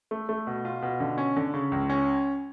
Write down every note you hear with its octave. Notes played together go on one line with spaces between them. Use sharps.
A3
A3
B2
F4
B2
D3
C#4
D3
C#3
C#2
C#4